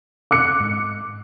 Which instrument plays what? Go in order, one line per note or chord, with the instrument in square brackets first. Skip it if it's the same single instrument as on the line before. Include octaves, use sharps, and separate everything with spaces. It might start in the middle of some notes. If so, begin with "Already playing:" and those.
[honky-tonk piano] D6 F#6 C#7
[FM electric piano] G#2